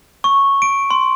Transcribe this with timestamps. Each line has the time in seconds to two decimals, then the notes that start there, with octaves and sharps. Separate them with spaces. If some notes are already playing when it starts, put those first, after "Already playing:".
0.24 C#6
0.62 D7
0.91 C6